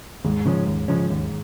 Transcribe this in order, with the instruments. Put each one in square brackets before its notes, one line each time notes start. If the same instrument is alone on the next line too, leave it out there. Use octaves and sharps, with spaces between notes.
[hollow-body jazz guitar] D#2 [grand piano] G#2
[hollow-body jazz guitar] C#3 F3 G#3 C#4
D#2
C#3 F3 G#3 C#4
D#2